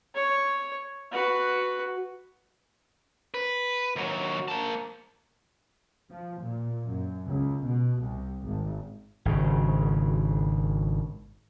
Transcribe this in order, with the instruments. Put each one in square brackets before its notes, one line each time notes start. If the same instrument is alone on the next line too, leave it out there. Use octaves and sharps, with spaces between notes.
[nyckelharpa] C#5
F#4 B4
[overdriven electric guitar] B4
D#2 F#3
A#3 A5
[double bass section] F3
A#2
F#2
C#2
B2
C2
G#1
[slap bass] G#1 C#3